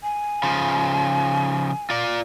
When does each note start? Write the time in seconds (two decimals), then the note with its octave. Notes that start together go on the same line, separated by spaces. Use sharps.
0.03 G#5
0.43 C#3 F3
1.90 F4 D5